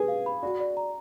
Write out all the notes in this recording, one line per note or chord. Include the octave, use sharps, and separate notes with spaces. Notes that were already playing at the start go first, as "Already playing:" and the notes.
Already playing: G#4 B4
F5
B5
F#4 D5
D5
A#5